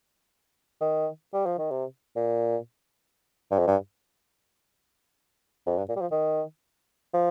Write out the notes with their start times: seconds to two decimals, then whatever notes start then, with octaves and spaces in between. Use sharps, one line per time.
0.81 D#3
1.33 G3
1.46 F3
1.58 D#3
1.71 C3
2.16 A#2
3.51 G2
3.59 F2
3.67 G2
5.67 F2
5.78 G2
5.89 A#2
5.96 G3
6.01 F3
6.12 D#3
7.14 F3